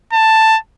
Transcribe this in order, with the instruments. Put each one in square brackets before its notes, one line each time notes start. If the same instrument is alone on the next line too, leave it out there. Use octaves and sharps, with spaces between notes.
[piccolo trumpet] A5